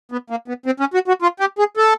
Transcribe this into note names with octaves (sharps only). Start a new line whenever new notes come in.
B3
A#3
B3
C4
C#4
F#4
F#4
F4
G4
G#4
A4